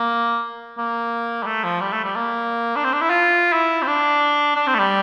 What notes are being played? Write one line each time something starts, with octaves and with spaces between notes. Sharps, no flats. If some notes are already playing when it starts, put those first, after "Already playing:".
Already playing: A#3
A#3
G3
A3
F3
G3
A3
G3
A#3
D4
C4
D4
E4
F4
E4
C4
D4
D4
C4
A3
G3